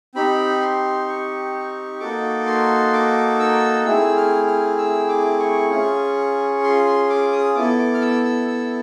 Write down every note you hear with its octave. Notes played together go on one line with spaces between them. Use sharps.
C4 D#4 G4 B5
C6
C#6
A#3 D#4 F#4 A4 D6
C6
D6
E6
A3 C4 E4 G#4 E6
F6
F6
E6
D6
C#6
C#4 F4 G#4
C6
C6
D6
D#6
B3 E4 A4 D6
D6
F6
E6
E6
E6